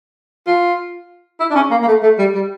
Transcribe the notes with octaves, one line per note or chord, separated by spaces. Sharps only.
F4
E4
D4
C#4
A#3
A#3
A3
A3
G3
G3